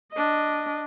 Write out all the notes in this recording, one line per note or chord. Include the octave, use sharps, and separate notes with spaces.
D4 D#5